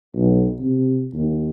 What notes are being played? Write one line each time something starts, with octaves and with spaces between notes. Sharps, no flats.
B1
C3
D#2